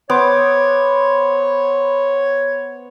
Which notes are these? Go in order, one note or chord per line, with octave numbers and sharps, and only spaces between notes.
B3 C5 C#5 D6